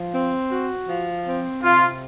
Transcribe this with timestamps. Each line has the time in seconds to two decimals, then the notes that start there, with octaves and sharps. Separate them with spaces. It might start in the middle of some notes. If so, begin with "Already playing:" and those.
Already playing: F3
0.13 C4
0.51 F#4
0.88 F3
1.26 C4
1.63 C3 F4